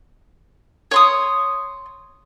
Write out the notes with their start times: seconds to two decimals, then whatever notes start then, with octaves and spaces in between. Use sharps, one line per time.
0.91 C#5 C6 D#6